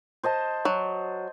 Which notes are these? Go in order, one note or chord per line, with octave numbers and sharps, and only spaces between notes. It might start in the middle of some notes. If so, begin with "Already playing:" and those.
C5 D#5 A5
F#3